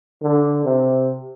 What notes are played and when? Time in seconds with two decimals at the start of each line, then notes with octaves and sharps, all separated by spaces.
0.22 D3
0.65 C3